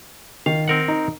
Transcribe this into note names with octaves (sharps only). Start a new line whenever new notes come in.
D#3 F5
C4 A#4 F#5
D#4